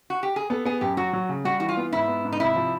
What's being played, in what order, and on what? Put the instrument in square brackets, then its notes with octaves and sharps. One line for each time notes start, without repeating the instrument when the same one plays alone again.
[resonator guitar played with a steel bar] F#4
G4
G#4
[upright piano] B3 [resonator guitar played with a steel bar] A4
[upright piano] B3 [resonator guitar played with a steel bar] G#4
[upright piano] F#2 [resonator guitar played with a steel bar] G4
[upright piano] F#3 [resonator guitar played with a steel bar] F#4
[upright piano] F#3
C#3
[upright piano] G3 [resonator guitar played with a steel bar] F#4
[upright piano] E3 [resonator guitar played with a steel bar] F#4
[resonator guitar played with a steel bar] F4
[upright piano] B3
[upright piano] G#2 [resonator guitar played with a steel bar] E4
[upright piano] B3
G#2
[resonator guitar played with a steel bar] D#4
[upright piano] C3 [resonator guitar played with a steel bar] E4
[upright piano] F3